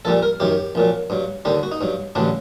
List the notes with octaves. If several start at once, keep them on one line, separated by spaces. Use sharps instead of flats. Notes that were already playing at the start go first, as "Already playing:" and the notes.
A#1 A#2 G3 A4
A#4
F#2 D#3 F#3 G4
A#1 A#2 F#3
G2 F#3
D#2 D3 G3 G4
F#4
D#4
G2 F#3
A1 G2 D3 F#3 D4